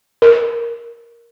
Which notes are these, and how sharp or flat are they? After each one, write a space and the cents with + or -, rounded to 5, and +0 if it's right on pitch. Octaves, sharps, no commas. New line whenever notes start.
A#4 +5